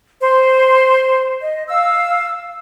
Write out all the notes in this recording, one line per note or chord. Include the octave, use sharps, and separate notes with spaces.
C5
D#5
F5 E6